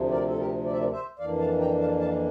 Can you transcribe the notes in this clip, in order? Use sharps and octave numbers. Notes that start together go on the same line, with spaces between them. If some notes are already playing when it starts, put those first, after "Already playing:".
Already playing: D2 C3 F3
A#4 D5
A4
G4 A#4
D5
E5
A#4 D5
C5 E5
F2 E3 A#3 D4 D5 F5
F5 A5
G5 A#5
F5 A5
F5 A5